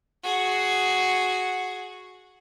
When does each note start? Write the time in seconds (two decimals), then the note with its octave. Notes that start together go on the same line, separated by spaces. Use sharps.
0.24 F#4 G#4